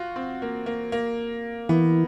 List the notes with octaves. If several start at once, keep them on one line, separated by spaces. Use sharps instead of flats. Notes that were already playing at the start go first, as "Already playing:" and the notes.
Already playing: F4 F#4
C4
A#3
A#3
A#3
E3 B3